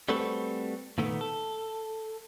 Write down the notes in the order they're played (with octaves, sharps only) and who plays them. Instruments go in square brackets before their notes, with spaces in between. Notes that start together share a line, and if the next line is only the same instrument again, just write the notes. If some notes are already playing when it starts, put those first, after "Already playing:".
[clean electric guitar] G3 A3 C4 F#4 A4 B4
A#2 D#3 A3 B3
A4